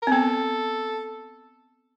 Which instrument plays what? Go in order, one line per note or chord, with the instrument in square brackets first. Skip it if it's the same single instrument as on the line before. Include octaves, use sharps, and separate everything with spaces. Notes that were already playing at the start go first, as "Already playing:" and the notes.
[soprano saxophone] A#4
[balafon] C4
[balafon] B3 [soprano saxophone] A4